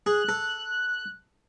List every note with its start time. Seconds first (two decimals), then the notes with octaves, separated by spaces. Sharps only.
0.06 G#4 F#6
0.29 A4